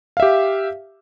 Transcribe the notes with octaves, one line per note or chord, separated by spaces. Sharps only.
G4 E5 F5